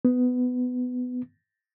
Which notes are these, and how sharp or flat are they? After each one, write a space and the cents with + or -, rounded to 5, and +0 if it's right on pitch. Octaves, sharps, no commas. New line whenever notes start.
B3 +15